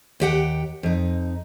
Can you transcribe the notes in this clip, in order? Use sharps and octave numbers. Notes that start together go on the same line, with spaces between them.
D#2 G4 F#5 G5
F2 D#4